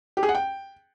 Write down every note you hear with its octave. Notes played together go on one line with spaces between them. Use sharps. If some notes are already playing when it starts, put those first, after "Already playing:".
G4
G#4
F#5
G5